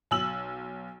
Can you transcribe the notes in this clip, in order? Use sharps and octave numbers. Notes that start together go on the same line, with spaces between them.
B1 E6 F#7